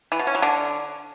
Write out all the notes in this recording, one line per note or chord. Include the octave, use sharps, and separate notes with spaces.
E3
B2
C#4
F#3
D3